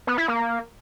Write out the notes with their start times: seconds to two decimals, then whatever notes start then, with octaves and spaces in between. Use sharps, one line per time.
0.07 B3
0.18 E4
0.28 A#3